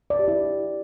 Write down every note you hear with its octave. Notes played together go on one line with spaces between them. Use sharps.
D5
G4
E4